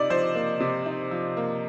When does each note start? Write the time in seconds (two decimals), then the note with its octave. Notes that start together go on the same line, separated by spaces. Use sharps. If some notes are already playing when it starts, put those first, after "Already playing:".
Already playing: C3 D#4 D5
0.10 F3 C5
0.35 A#3
0.60 C3
0.86 D#4
1.11 F3
1.37 A#3